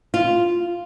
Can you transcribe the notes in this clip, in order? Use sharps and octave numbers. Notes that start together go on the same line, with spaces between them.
F4